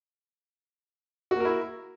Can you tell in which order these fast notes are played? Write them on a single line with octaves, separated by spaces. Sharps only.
F#4 A#3 A#4 E4